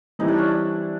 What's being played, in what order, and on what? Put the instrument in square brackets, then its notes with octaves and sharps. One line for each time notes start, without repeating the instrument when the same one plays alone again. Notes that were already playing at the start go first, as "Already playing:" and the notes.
[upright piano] E3 G3 C4 E4 [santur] D#4
[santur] D4
C#4
D4